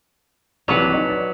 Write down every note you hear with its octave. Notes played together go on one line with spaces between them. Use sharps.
A#1 C3 E3 F#3 B4 F#5
D#4
D5